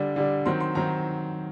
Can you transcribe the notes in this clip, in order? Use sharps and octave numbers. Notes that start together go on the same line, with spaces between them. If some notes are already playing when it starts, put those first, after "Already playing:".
Already playing: D3 G3 D4
D3 G3 D4
D#3 F#3 C4 C6
C6
D#3 F#3 C4 A#5